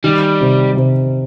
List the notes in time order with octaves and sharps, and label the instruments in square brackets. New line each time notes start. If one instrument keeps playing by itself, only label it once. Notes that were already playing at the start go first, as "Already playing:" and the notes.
[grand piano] D#3 [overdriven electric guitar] G3
[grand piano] C3
C3